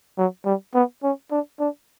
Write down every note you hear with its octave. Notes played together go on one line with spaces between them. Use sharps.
F#3
G3
B3
C#4
D4
D4